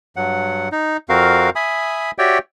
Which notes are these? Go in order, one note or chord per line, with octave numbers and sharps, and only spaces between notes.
G2 F#3 F#5
D#4
F2 C4 F#4 A#4 F5
E5 G#5 B5 D#6
F#4 G4 C#5 D5 E5 G5